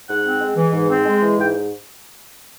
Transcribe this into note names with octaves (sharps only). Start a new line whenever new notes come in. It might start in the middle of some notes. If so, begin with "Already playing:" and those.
G#2 F#5
C4
G#3
E3
G#2
C4
G#3
E3
G#2 G5